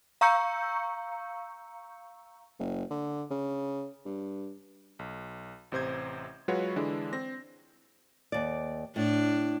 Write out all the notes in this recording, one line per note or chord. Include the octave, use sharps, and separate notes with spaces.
F5 A#5 C#6 E6 G6 C#7
F#1
D3
C#3
G2
B1
A1 C3 C5 G6 G#6
F#3 G#3 F4 F#4 B4 C#5
D3 E3 G#3 D4 E4
C4 A#6
D#2 D5
A2 D4